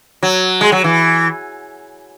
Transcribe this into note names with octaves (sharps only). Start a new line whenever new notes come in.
F#3
G#3
F#3
E3